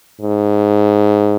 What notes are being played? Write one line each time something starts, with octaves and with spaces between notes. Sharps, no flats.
G#2